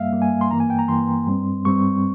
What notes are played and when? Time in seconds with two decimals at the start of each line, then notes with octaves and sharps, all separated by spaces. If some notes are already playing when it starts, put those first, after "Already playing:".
Already playing: G2 G3 A#3 E5 F5
0.12 G2 G3 A#3
0.22 G#5
0.41 C6
0.51 G2 E3 A#3 A#5
0.60 G#5
0.70 G5
0.79 A#5
0.88 G2 E3 A#3 C6
1.27 G2 G3 C4
1.65 G2 G3 C4 C#6